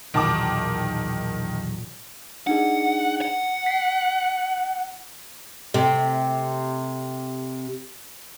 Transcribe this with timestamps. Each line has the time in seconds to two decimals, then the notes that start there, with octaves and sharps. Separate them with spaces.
0.14 B1 E2 A#2 D#3 A5 D6
2.47 D4 D#4 G#4 F#5
3.21 F#5
3.66 B6 C7
5.74 C3 A3